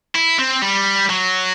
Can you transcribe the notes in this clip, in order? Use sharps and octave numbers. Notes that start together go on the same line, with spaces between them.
E4
C4
G3
F#3